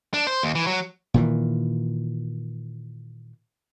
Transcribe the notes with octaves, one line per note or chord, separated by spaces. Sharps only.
D4
C5
D#2
E3
F#3
A#2 D#3 E3